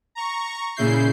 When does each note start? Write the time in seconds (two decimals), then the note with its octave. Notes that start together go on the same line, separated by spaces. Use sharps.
0.15 A#5 C#6
0.76 A#2 C#3 E4 G6 C7